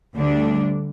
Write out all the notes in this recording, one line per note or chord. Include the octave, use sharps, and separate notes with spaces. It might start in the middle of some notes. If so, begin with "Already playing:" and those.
D2 D3 G3 D4